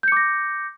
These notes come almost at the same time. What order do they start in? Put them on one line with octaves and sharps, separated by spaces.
G6 C#7 D6 A#6